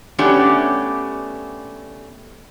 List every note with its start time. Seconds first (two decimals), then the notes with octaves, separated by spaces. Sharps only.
0.18 A3 B3 C#4 D4 G4